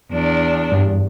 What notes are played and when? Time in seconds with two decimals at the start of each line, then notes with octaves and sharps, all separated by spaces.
0.11 E2 D4
0.72 G2